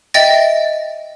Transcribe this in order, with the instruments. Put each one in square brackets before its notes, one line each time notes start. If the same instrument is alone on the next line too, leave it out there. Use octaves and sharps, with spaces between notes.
[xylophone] D#5 E5 G5 A6 A#6